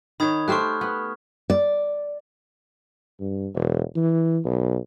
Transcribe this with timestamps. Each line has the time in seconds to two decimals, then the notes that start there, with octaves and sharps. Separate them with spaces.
0.20 D#3 C#5 B5 D#6 G#6
0.48 A3 G4 C5 C#6 F6 F#6
0.81 B3
1.50 D5
3.20 G2
3.55 E1
3.96 E3
4.45 B1